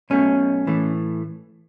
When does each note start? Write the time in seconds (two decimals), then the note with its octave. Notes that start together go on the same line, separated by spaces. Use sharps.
0.10 B1 B2 A3 C#4
0.67 A2 E3 A3